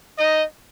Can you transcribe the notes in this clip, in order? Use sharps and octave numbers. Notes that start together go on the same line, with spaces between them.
D#4 D#5